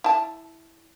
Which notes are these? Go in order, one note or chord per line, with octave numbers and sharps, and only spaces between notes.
E4 A5